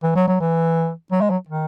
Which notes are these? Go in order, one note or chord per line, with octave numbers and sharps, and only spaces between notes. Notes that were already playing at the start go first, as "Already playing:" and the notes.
E3
F#3
F#3
E3
F#3
G#3
F#3
D#3